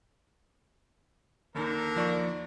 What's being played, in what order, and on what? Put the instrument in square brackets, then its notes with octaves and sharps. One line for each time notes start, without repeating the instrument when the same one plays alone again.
[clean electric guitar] D#2 D#3 [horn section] D3 A#4
[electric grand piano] F3 D5 C#6